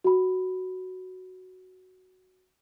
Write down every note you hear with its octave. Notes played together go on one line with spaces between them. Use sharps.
F#4 B5